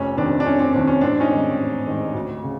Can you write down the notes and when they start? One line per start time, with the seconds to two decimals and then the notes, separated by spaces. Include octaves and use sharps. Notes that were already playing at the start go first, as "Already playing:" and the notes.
Already playing: F1 C#4
0.17 D#2 D#3 C4 D4
0.40 D4
0.46 F1 C#4
0.59 C4 D4
0.73 D#2 D#3 C4 D4
0.87 C#4
1.01 A1 C4 D4
1.20 C#4 D#4
1.30 G#2 D#3
1.58 A1
1.87 G#2 D#3
2.14 D2
2.44 C#3